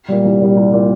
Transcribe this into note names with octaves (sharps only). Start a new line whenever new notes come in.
A#2 G3
C2
A#2 G3
C2
A#2 G3